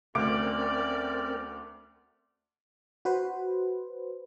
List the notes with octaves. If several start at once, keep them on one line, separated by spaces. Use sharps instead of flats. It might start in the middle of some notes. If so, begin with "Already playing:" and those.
D2 C4 C#4 A#4 D5 D6
F#4 B4 C5